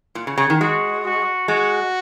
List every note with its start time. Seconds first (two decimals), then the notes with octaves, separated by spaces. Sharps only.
0.15 A#2
0.27 C#3
0.38 C#3
0.50 D#3
0.60 G#3 F#4
1.05 F#4
1.48 G#3 F#4